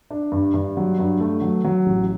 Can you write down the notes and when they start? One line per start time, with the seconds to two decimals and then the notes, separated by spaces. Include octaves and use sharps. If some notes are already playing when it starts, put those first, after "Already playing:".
0.11 D4
0.32 G2
0.54 G2
0.77 F#3
0.99 G2
1.20 A3
1.41 F#3
1.64 F#3
1.86 A1